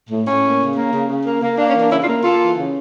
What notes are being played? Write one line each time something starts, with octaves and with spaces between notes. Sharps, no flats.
A2
A2 C#4
A#3
C#3
A#3
C#3
C#3
A#3
A#3
A#3 D4
C#4
E3
D4
C#3 C#4 E4
D4 F4
A#3
A#3 F4 A4
E3
C#3